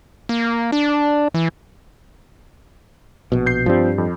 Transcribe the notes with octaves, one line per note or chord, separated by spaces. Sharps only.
A#3
D4
E3
A#1 B2
G6 C7
G2 F3 G3 C4
F2